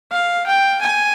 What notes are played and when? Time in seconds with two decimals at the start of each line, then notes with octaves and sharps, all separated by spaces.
0.11 F5
0.46 G5
0.81 G#5